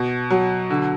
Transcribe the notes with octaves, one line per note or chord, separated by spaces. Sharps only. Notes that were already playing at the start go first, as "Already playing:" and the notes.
Already playing: B2
F#3
D3